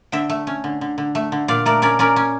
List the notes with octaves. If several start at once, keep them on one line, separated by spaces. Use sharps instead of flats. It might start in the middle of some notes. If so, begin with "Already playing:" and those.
D3 E5 G5
A3
C#4
D3
D3
D3
A3
D3
A#2 D5 F5
A3 A#4 D5
C#4 A#4 D5
C#4 A#4 D5
C#4